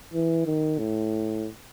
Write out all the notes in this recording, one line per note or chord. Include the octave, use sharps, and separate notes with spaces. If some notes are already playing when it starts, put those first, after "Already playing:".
E3
D#3
A2